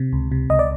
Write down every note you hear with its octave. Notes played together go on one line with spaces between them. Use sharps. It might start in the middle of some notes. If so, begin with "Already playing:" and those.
Already playing: C3
C#2
C3
C#2 D#5
D5